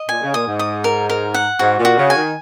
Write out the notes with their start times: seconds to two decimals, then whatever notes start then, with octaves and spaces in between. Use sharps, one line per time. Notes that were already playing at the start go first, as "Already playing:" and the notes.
Already playing: D#5
0.09 A#2 G#5
0.22 C#3
0.34 A#2 D#6
0.47 G#2
0.59 D#6
0.84 A#4
1.10 A#4
1.34 F#5
1.59 G#2 F#4
1.78 A#2
1.85 F#4
1.97 C#3
2.10 G#5
2.15 D#3